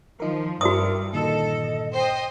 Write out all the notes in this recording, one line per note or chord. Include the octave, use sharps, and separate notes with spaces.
D#3 F3 D#4 A#4
G2 F#4 A#4 C5 D5 E5 D#6
A#2 D3 D#3 A4 D#5
C5 D#5 G5